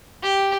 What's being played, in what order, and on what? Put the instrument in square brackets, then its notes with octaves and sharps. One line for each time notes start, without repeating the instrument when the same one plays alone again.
[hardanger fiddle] G4